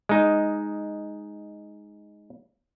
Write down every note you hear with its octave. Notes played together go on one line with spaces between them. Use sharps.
G#3 D#4